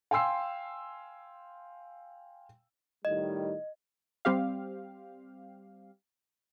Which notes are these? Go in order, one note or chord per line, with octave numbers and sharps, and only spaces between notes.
F5 G5 G#5 C6 E6 C7
A2 D#3 G3 D#5
G3 C4 G4 F5